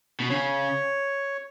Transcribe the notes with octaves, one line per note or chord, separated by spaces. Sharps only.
B2
C#3 C#5